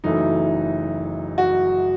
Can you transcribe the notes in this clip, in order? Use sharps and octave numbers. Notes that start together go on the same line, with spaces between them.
F#1 F#2 E3 A3 D#4
F#4